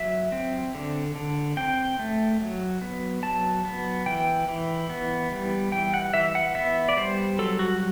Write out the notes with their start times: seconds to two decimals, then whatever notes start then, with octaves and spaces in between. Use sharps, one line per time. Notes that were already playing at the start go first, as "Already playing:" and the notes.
Already playing: F#3 E5
0.32 C4
0.75 D3
1.16 D3
1.57 C4 G5
1.99 A3
2.41 F#3
2.81 B3
3.23 F#3 A5
3.65 B3
4.06 E3 G5
4.48 E3
4.90 B3
5.31 G3
5.72 E3 G5
5.94 F#5
6.14 E3 E5
6.35 F#5
6.55 B3 E5
6.89 D5
6.97 G3 C5
7.39 F#3 A4
7.59 F#4